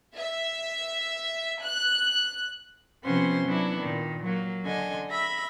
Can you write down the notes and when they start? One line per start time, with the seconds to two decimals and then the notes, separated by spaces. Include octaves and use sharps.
0.17 E5
1.63 F#6
3.05 C3 F3 B3 C#4 C5 C6
3.46 F#3 B3 D4 E4
3.80 A#2 D#3
4.24 F#3 A#3
4.65 D3 D#5 G#5
5.11 E5 B5 A#6